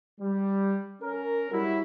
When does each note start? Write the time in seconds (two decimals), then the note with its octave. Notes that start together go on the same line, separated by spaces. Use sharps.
0.20 G3
1.02 C#4 A#4
1.51 F#3 G3 E4